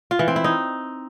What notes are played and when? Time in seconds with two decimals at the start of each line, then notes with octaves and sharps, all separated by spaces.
0.11 F4
0.19 E3
0.28 C4
0.36 E4
0.44 D#4